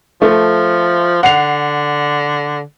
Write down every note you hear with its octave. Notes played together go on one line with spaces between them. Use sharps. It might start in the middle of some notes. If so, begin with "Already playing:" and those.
F3 A3
D3 F#5 C7 F7